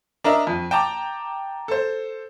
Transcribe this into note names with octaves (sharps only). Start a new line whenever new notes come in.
D4 A#4 D#5 E5
F2
G5 A5 A#5 D6
A4 C5